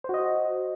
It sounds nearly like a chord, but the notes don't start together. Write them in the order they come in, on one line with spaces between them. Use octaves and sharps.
C5 F#4 D#5